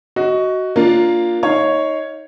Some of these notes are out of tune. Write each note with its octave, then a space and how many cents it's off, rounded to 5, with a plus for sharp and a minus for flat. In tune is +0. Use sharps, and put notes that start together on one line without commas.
F#4 +10 D#5 +15
A#3 +0 D4 +5 F4 +0
D#4 +20 C#5 +0 F5 +0